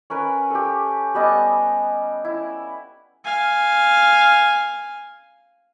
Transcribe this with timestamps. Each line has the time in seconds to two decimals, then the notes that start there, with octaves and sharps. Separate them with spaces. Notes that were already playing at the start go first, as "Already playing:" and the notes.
0.10 C#4 A#4 B4
0.50 G4 A4
1.14 G3 B3 D#5 G#5
2.25 E4
3.24 F5 G#5